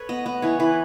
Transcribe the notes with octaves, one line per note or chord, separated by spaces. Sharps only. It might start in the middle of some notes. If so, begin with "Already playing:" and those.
Already playing: A4 B4 C#5
B3 D#5
B3 D#5
E3 C#5
E3 B4